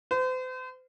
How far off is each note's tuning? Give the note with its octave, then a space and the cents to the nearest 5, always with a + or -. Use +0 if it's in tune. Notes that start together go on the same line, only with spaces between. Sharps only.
C5 -40